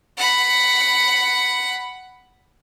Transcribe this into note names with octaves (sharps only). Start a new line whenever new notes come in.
F#5 B5